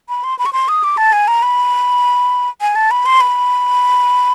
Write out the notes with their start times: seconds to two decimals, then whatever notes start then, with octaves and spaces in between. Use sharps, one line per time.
0.09 B5
0.24 C6
0.39 B5
0.46 C#6
0.53 C6
0.68 D#6
0.84 D6
0.97 A5
1.13 G#5
1.28 A#5
1.42 B5
2.61 G#5
2.76 A5
2.91 B5
3.06 C6
3.21 B5